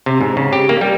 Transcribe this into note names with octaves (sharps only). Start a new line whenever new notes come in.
C3
G#2
C#3
G4
A#3
G3